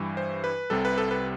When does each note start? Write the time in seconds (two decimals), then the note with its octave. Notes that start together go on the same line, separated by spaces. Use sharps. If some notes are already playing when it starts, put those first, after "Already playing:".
Already playing: G2 E3 G3
0.17 C5
0.44 B4
0.70 C2 C3 G3 A4
0.85 B4
0.98 A4
1.11 B4